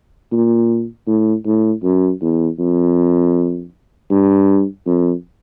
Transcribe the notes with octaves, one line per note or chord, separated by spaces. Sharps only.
A#2
A2
A2
F#2
E2
F2
G2
F2